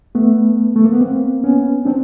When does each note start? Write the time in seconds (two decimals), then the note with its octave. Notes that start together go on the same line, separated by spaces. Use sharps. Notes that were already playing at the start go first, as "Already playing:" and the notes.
0.15 A3 B3
0.76 A3
0.85 A#3
0.92 B3
1.01 A#3 C4
1.44 B3 C#4
1.85 C4 D4